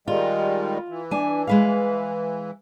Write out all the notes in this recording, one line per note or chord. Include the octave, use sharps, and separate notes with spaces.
D#3 G3 G#3 F4
E3
D4 G#5
G#3 B4 F5